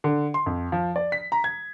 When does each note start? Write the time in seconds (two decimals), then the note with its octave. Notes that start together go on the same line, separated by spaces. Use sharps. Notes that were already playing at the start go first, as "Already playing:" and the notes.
0.04 D3
0.34 C6
0.46 F2
0.72 F3
0.96 D5
1.12 B6
1.32 A#5
1.44 G#6